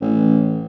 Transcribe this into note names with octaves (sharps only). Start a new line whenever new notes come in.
A1